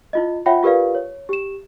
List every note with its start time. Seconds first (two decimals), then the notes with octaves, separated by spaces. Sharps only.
0.13 E4 F4 D#5
0.46 F4 C#5 E5 F#5 G5 B5
0.63 F4 G4 A#4 B4 D5 F5
0.95 C#5
1.29 G4 E7